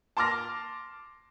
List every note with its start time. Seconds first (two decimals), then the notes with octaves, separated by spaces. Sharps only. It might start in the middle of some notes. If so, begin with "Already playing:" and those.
0.17 A5 C6 D6 F6 A#6